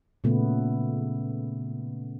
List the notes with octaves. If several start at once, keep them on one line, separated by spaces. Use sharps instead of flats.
A#2 C#3 A3 B3